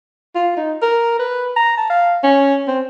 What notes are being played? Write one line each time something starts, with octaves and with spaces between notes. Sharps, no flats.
F4
D#4
A#4
B4
A#5
A5
F5
C#4
C4